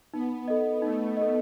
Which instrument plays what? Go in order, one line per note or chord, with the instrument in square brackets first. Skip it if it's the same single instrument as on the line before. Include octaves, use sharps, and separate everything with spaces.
[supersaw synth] B3 [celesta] D#4
[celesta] A4 D#5
[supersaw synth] A3 [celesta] D#4
[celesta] A4 D#5